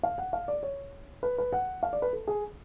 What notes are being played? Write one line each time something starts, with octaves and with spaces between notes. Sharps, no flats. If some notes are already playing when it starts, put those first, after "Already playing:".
F5
F#5
F5
D5
C#5
B4
B4
F#5
F5
D5
B4
A4
G#4